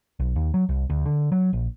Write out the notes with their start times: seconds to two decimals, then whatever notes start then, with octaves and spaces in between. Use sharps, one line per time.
0.20 B1
0.36 D#2
0.54 F#3
0.69 C2
0.90 D2
1.06 D3
1.32 F#3
1.53 A#1